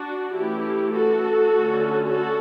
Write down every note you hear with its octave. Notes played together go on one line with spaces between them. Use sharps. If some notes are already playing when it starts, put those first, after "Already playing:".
Already playing: D4 F#4
E3 A3 C#4 E4 G4
F#4 A4
D3 A3 C#4
F#4 A4